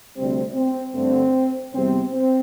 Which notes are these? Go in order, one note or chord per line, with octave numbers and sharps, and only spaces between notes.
D2 C3 G3 C4
C4
G2 D3 A3 C4
E2 C3 G3 C4
C4